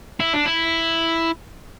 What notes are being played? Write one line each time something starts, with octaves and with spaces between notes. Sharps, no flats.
E4
D4
E4